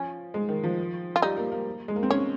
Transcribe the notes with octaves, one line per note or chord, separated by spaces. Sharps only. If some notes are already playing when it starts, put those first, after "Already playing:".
Already playing: F3 C#4
G#3
D#3
F3
F4
G3 D#4
A#3
A#3
G#3
A#3
C4
C#4 C#5